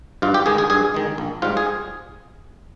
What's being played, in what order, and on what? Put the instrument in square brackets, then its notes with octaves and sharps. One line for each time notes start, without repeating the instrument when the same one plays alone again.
[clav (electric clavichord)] G2 F4
G4
D#3 G#3 G#4
G#4
G2 G#4
D#3 G#3
A#1
G#2 G3 F4
G#4